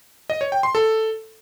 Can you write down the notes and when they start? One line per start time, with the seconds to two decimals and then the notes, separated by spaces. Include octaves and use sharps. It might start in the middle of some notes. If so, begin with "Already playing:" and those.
0.30 D#5
0.41 C#5
0.52 G5
0.63 C6
0.75 A4